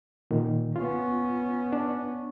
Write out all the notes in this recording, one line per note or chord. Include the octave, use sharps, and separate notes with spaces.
A#2 D#3
B3 C#4 F4
D4